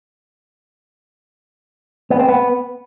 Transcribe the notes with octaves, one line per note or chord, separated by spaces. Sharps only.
B3
C4
B3